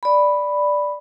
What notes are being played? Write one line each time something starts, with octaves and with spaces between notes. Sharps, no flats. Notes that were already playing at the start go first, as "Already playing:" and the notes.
D5 B5